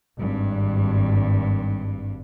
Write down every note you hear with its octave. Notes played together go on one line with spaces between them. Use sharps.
G#1 G2